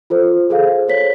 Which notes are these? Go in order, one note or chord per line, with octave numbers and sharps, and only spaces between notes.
F4 A4 C5
G#4 A4 C5 F5
C5 C#5 B6